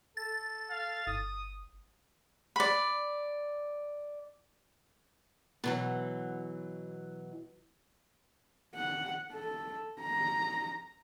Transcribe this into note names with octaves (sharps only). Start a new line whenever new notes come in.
A4 A6
F5
G1 D#6
D5 B5
B2 E3 F#3
F#5
A4
A#5